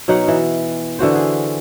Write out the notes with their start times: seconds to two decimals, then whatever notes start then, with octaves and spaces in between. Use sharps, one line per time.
0.08 B2 F#3 D#4 F#5
0.28 E3
0.99 D3 E3 F#4 C5
1.15 G#4